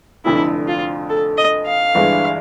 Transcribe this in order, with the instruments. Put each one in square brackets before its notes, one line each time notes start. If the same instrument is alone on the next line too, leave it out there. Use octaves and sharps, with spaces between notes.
[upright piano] F1 F2 D3 [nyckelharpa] E4
[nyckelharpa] F4
A4
D#5
F5
[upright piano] G1 G2 E3 G#3